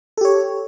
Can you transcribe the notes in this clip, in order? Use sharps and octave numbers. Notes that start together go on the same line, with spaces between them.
G4 A4 C#5